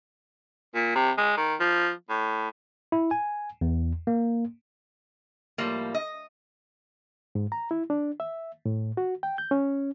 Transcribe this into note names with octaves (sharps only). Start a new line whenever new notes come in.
A#2
C3
G#3
D#3
F3
A2
E4
G#5
E2
A#3
A2 F3 G3 A#3
D#5
G#2
A#5
E4
D4
E5
A2
F#4
G5
G6
C#4